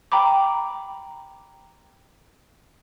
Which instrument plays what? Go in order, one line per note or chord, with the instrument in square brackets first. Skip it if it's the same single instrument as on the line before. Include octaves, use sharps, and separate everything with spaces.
[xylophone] G5 A#5 B5 D6